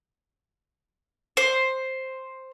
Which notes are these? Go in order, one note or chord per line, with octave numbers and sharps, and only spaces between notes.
C5